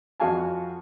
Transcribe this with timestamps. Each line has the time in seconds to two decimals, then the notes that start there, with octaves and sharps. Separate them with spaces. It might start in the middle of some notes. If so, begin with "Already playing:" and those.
0.20 F2 F#4 F5 G#5 A5